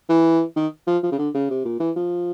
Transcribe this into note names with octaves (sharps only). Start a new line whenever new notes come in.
E3
D#3
F3
F3
C#3
D3
C#3
C3
A#2
E3
F3